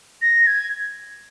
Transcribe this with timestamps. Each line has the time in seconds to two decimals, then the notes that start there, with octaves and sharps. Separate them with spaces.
0.22 A#6
0.47 G#6